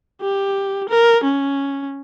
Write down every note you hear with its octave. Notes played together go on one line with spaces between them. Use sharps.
G4
A#4
C#4